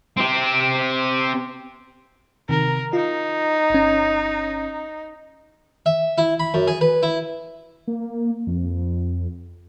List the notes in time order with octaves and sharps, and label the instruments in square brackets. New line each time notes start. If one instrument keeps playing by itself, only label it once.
[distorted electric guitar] C4 G4
[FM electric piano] C3 D#3 [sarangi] A#4
[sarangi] D#4 [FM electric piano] F4
[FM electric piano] G1 C#4
[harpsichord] E5
E4
B5
F#2
G#4
B4
E4
[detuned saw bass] A#3
F2